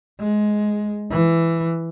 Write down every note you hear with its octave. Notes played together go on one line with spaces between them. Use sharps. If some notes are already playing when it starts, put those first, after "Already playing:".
G#3
E3